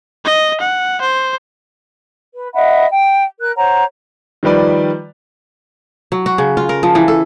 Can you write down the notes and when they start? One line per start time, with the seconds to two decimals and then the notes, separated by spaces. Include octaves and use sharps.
0.25 D#5
0.60 F#5
1.01 C5
2.33 B4
2.54 D#5 E5 F#5 B5
2.91 G5
3.39 A#4 F#6
3.56 C5 C#5 F#5 A#5
4.43 D#3 F3 G3 B4 D5
6.12 F#3
6.26 F#4
6.38 C#3
6.57 F4
6.69 A#4
6.83 F3
6.95 E3
7.08 A4